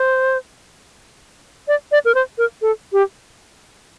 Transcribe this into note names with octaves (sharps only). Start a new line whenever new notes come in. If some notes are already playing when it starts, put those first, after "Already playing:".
Already playing: C5
D5
D5
A#4
C5
A#4
A4
G4